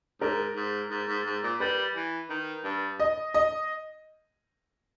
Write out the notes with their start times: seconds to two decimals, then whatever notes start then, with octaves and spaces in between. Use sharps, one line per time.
0.21 G#2 A#4
0.56 G#2
0.91 G#2
1.08 G#2
1.26 G#2
1.43 A#2
1.60 G3 B4
1.95 E3
2.30 D#3
2.64 G2
3.00 D#5
3.34 D#5